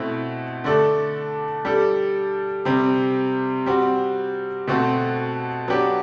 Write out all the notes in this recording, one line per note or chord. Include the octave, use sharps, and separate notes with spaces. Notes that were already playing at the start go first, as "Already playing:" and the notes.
Already playing: B2 A3 C4 E4
D3 A3 D4 A4
G3 D4 A4
C3 G3 C4
G3 C4 F#4
B2 A3 C4 F#4 A4
F#3 B3 D4 G4